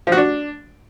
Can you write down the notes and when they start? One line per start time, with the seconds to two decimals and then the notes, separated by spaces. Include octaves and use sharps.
0.07 F3
0.12 F#4
0.17 D4